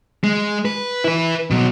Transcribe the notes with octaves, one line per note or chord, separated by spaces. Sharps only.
G#3
B4
E4 B4
B2 F#3